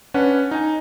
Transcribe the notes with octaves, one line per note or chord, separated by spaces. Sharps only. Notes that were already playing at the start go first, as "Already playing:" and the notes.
C#4 D4 B4 F#5
D#4 G#5